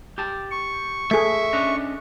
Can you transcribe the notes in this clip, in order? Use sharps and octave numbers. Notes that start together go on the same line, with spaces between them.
G4 A5
C#6
A3 G#4 E5
C#4 D4 D#5